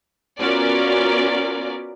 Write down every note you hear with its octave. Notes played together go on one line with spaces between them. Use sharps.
B3 C#4 F4 F#4 A#4 D5